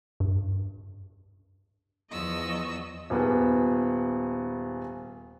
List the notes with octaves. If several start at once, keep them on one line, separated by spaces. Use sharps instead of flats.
G2
E2 F3 B3 D#5 C#6 E6
D#1 B3 G#4